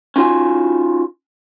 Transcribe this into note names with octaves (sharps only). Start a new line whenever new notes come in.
C#4 D#4 F4 F#4 G#5